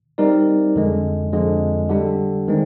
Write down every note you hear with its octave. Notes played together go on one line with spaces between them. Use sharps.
G3 C4 D#4 A#4 D5
F2 D3 G#3
F2 D3 G#3
D3 G3 D4
D#3 G#3 C4